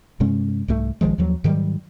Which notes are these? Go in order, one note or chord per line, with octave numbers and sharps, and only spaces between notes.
G2 C3 G#3 C#4
C2 G#2 A3
A#1 D#3 F3 G#3
D#2 F3 F#3
G#2 D#3 F#3 G3